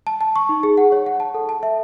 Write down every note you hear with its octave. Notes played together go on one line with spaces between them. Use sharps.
A5
A5
C#6
D#4
G#4
F#5
C#5
F#5
A5
A4
A5
E5